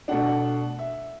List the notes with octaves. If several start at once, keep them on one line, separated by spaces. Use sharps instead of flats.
B2 A3 D4 F#5
E5